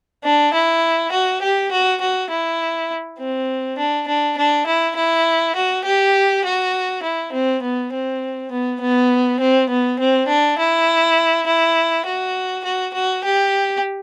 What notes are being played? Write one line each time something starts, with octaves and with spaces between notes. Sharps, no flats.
D4
E4
F#4
G4
F#4
F#4
E4
C4
D4
D4
D4
E4
E4
F#4
G4
F#4
E4
C4
B3
C4
B3
B3
C4
B3
C4
D4
E4
E4
F#4
F#4
F#4
G4